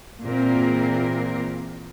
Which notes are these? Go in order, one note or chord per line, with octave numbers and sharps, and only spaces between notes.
A#2 E3 C4 G#4 A#4